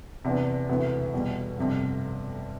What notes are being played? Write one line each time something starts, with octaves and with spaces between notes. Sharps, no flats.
E2 C3 E3 B3 D4
E1 D2 C3 E3 B3
E2 B2 G3
G1 F2 C3 G3